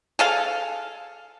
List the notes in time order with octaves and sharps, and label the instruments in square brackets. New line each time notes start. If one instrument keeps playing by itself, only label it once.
[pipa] G#4 A4 F5